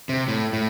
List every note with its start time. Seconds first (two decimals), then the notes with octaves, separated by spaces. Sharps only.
0.09 C3
0.28 A2
0.53 A2